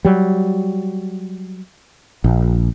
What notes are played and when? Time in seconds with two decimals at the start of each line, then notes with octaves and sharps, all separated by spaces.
0.05 F#3 G3
2.24 A#1